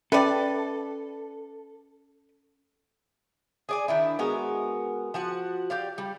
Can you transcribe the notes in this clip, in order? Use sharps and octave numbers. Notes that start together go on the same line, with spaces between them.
C#4 A4 B4 D5 E5 G5 A5
G#4 D5 G#5
D#3 D4 E4
G#3 B3 F#4 A#4
F3 F#4 F#5
G4 D5 F5
G3